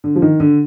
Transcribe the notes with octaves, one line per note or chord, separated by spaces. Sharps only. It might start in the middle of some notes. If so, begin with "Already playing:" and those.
D3
F3
D#3
D3